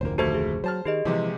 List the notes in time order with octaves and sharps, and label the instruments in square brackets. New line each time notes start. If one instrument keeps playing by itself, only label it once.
[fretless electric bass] F1 D2 A#2 [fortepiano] A#3 C5
[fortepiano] D#2 A3 A4 [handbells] F#4 C5 G#6
[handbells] G#4
[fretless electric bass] F#3 [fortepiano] C5 A5 F6
[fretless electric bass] D#3 [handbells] G4 G#4 D#5
[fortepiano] A#1 C3 G#3 [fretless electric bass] E3